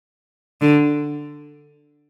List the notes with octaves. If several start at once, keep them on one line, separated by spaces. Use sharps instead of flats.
D3